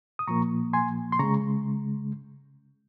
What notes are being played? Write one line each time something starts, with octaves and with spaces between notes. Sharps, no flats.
D#6
A#2 F3 A#3 A#5 C#6
G#5 C6
C6
C#3 G#3 A#5 C#6